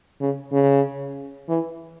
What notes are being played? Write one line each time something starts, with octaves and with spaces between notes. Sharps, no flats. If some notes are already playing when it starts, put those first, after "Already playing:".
C#3
C#3
E3